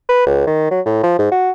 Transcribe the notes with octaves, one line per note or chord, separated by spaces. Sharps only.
B4
C#2
D#3
F#3
A2
F3
G#2
F#4